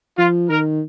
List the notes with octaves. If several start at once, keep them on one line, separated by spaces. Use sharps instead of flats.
F3 F4
D#3 A#4